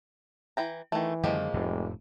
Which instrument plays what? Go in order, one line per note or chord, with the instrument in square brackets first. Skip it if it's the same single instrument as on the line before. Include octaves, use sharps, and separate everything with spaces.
[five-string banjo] E3 G5 A#5
[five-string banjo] D#3 A3 [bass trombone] E3
[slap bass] F#2 D3 D#3 [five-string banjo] F3 G4 [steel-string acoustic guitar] G#3 A#3
[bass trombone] F1 [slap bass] F2 A2 C3